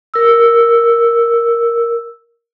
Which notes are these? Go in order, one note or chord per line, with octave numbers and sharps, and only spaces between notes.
A#4 E6